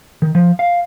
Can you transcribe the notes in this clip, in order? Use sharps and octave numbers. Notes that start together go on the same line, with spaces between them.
D#3
F3
F5